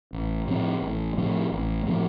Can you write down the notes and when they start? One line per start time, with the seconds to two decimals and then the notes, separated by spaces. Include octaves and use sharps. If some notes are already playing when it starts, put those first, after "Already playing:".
0.13 A1
0.48 A2 F3 C4
0.82 A1
1.18 A2 F3 C4
1.52 A1
1.87 A2 F3 C4